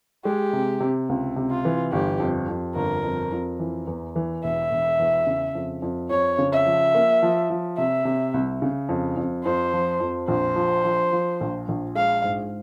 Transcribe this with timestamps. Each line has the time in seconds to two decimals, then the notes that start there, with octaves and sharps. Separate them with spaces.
0.25 G#3 G4
0.53 C3
0.80 C3
1.09 C#2
1.36 C3
1.51 F4
1.65 E3
1.92 G1 G4
2.20 F2
2.49 F2
2.75 G1 A#4
3.04 F2
3.32 F2
3.60 E3
3.87 E2
4.16 E3
4.44 E1 E5
4.71 E1
4.99 E2
5.27 C#3
5.55 F2
5.82 F2
6.10 F2 C#5
6.38 C#3
6.53 E5
6.66 F3
6.94 A#3
7.23 F3
7.50 F3
7.78 C3 E5
8.05 C3
8.34 C2
8.62 C#3
8.89 F2
9.17 F2
9.45 F2 C5
9.73 F3
10.00 F2
10.28 A#1 C5
10.56 F3
10.84 F3
11.12 F3
11.41 A#1
11.68 A#1
11.95 G#3 F5
12.24 G#2